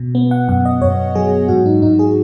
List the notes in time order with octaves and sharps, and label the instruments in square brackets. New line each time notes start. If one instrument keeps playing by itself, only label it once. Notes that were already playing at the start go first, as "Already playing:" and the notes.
Already playing: [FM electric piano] B2
B3
F#5
F#2 F#5
D#5
F#2 C#5
F#3 G#4
G#2 F#4
D#4
G#2 D#4
G#4